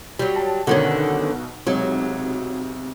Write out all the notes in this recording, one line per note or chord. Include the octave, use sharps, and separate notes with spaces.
F#3 G3
A5
B1 B2 D3 D#3 C#4 F#4
B1 C3 F#3 G#3